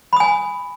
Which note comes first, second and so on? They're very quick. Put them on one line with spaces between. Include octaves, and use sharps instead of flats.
B5 D#6 G#5